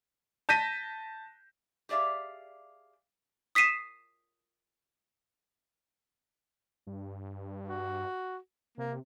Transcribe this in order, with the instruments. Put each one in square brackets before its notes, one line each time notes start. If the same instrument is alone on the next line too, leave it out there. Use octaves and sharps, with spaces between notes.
[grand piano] A5 G6 A#6 B6 D#7
[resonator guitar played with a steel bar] G4 G#4 D5 E5 F5
[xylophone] D#6 B6 C7 D#7 E7
[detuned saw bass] G2
[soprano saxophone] F#4
[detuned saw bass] C3 [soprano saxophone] A#3